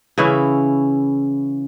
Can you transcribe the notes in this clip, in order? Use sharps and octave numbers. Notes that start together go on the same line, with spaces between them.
C#3 E3 C#4 E4